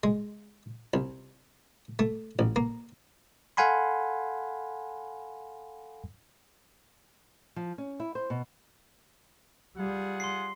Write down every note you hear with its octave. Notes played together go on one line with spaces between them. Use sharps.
G#3
C2
A3
A1
A#3
A4 F5 F#5 G#5 B5 C6
F3
C#4
E4
C5
B2
G3 F4 G#4 F#5
C6 C7